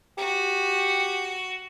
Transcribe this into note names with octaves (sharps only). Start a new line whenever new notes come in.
F#4 G4